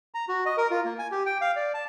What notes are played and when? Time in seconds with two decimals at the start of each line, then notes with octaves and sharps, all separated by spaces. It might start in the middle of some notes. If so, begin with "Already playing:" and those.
0.14 A#5
0.29 F#4
0.46 D#5
0.57 A#4
0.71 F4
0.85 A#3
0.99 G#5
1.12 G4
1.26 G5
1.41 F5
1.56 D5
1.74 A5